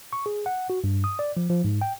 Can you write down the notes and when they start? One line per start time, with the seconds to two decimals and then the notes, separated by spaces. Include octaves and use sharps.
0.13 C#6
0.26 G#4
0.46 F#5
0.70 F#4
0.84 G2
1.04 D#6
1.19 D5
1.37 F3
1.50 F3
1.64 G#2
1.81 G5